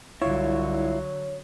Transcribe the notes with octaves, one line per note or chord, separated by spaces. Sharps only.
C2 D3 F#3 E4 F4 C#5